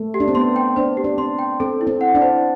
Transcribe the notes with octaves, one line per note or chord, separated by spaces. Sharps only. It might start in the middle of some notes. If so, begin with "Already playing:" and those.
Already playing: A3
G4
D4
C4
B3 C6
G5
D4 C5
G4
D4
C4 C6
G5
C4 A4
E4
C4
F#5
D4
C5